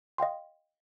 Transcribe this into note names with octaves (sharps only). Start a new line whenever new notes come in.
D#5 F5 G5 C6